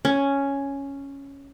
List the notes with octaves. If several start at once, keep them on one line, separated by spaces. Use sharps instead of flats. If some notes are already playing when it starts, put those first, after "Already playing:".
C#4